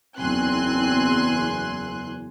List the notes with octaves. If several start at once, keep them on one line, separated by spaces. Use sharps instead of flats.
F#1 E2 C4 G#5 C6 F#6